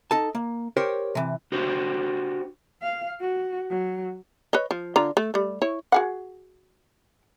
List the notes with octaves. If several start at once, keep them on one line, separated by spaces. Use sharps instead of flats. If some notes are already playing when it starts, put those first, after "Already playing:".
D#4 A4 A5
A#3
G4 A#4 C5 C#5 G5
C3 E3
D4 F#4 G4 C5
F5
F#4
F#3
B4 C#5 D#5
F3
D3 F4 A#5
A3
G3 A3
E4 C#5
F#4 G#4 F#5